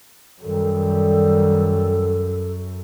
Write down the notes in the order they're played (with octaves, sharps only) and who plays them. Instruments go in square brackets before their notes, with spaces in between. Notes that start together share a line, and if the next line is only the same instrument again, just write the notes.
[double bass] F#2 [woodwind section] D#3 G3 [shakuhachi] A4